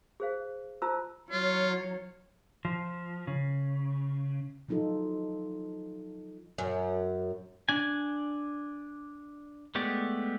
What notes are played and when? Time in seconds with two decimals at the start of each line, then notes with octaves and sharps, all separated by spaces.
0.20 G#4 C5 F5
0.82 F4 C5 A5 A#5 E6
1.31 F#3 F4 C#5
2.65 F3
3.27 C#3
4.69 F3 F#3 D#4 F4 A4
6.58 F#2
7.69 D4 G#5
9.75 G#3 A3 B3 G4 D5